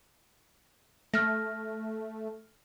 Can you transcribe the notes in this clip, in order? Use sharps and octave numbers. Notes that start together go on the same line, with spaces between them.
A3 F6 A#6